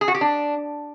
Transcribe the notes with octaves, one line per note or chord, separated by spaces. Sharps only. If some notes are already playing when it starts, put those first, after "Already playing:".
G#4
F#4
G4
D4